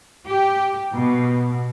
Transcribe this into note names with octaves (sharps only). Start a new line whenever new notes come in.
G4
B2